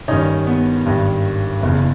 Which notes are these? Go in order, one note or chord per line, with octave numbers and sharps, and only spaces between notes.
G1 G2 D#3 C#4 D#4
B3
G#1 G2 D#3
F#1 E2 C#3